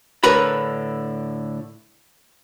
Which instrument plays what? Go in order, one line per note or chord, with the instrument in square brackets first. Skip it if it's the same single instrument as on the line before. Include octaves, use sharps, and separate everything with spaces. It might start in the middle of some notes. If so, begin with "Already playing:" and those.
[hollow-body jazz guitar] A2 D3 A#4 B4 B5